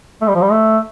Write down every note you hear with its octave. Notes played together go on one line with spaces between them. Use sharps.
A3
G3
F3
G3
A3